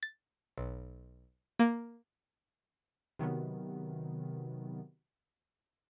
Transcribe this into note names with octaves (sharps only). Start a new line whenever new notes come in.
A6
B1
A#3
C3 D#3 F#3 B3